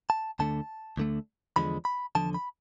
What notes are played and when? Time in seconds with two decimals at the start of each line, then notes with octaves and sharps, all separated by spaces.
0.10 A5
0.39 D2 D3 A3 A5
0.97 D2 D3 A3
1.56 E2 D3 F3 G#3 B5
1.85 B5
2.15 E2 D3 F3 A5
2.34 B5